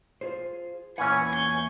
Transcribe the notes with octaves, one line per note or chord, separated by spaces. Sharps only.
F4 G#4 C5
E2 A#2 E3 C#4 F#5 G#5 C#7
C#6 G6